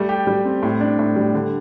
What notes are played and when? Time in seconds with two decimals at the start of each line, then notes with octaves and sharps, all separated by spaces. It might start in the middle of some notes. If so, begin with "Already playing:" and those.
Already playing: G3 A3
0.09 G4
0.27 G3
0.45 C4
0.63 A2
0.81 D4
0.99 A2
1.16 G3
1.34 D3